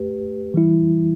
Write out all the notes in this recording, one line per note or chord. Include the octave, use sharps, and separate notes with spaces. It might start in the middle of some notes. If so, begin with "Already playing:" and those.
Already playing: A3 G4 B4
E3 G3 E4